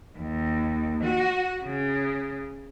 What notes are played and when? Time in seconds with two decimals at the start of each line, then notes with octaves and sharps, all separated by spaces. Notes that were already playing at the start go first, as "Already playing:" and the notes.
0.19 D#2
1.04 F#4
1.63 C#3